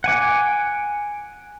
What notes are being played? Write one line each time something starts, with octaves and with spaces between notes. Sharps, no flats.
F#5 G#5 D6